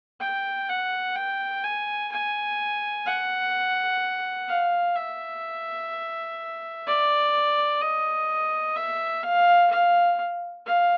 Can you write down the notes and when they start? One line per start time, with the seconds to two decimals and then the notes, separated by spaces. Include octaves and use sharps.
0.20 G5
0.69 F#5
1.15 G5
1.64 G#5
2.12 G#5
3.06 F#5
4.49 F5
4.95 E5
6.86 D5
7.81 D#5
8.76 E5
9.23 F5
9.71 F5
10.66 F5